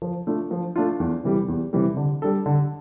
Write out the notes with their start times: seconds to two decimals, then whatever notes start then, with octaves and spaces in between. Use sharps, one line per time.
0.02 F3
0.27 A3 D4 F4
0.51 F3
0.76 A3 D4 F4
1.00 E2
1.24 C3 E3 G3
1.48 E2
1.73 C3 E3 G3
1.97 D3
2.22 G3 D4 A4
2.46 D3